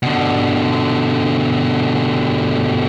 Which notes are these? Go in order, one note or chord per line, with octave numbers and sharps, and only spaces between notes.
B2 D3